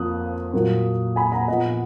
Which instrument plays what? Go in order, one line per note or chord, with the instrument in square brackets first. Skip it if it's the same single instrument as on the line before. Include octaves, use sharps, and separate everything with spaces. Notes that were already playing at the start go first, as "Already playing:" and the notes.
Already playing: [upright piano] F2 F3 A#3 D#6 F#6
A#2 F#3 A#3
G#5 B5
F#5 A#5
A#2 F3 B3 D#5 F#5